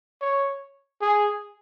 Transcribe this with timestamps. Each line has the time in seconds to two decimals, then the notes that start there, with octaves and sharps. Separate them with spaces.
0.21 C#5
1.02 G#4